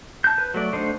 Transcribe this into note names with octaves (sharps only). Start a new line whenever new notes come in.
A5 G6
B4
F#3 A3 D5
D3 A3 D#4 C5